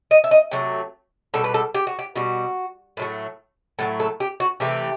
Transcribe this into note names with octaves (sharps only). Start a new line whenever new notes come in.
D#5
E5
D#5
C3 F#3 A3
B2 G3 A4
B4
A4
G4
F#4
G4
B2 G3 F#4
A2 F#3 A3
A2 F#3 A3 A4
A4
G4
F#4
C3 E3 A3 G4